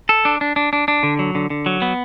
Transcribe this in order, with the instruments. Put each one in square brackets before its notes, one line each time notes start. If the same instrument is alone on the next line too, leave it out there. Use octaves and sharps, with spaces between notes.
[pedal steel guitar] A4
D4
D4
D4
D4
D4
D3
F#3
D3
D3
F#3
B3